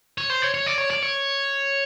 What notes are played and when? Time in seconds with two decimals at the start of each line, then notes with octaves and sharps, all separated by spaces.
0.18 C#5
0.30 C5
0.42 C#5
0.54 C#5
0.66 D5
0.78 C#5
0.90 D5
1.02 C#5